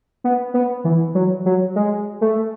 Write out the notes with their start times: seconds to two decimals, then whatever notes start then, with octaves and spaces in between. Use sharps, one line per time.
0.24 B3
0.54 B3
0.84 E3
1.15 F#3
1.46 F#3
1.76 G#3
2.21 A3